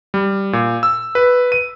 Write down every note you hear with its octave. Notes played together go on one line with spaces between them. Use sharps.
G3
A#2
E6
B4
D#7